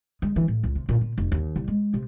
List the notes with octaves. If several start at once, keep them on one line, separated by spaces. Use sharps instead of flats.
G#3
E3
A2
C#2
C3
A#2
A#2
F1
D#2
C2
G#3
C3